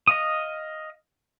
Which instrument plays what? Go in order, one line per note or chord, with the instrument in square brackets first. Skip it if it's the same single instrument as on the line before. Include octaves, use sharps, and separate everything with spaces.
[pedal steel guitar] D#5 F5 D#6